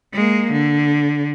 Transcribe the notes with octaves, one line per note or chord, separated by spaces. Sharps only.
G#3 A#3
D3